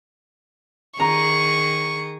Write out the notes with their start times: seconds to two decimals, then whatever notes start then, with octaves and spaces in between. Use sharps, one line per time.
1.00 D#3 G#4 A#5 C#6